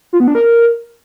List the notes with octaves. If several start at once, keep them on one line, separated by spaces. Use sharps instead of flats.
F4
B3
D4
A#4